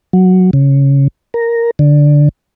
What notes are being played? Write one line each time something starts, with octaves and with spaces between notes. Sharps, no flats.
F#3
C#3
A#4
D3